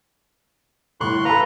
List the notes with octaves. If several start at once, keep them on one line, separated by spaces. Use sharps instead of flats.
G1 A2 C6 C#6 F#6
A4 B4 F5 A#5